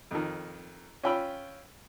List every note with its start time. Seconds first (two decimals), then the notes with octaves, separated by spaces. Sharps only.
0.11 F2 D#3
1.03 C#4 F4 G5 B5 E6